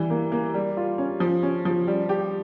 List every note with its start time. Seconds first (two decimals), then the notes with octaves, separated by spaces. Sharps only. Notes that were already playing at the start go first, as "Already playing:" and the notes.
Already playing: E3 G3
0.10 A#3
0.32 A#3
0.54 G3
0.77 F4
0.98 C#4
1.20 F3
1.43 C#4
1.65 F3
1.87 G3
2.09 G4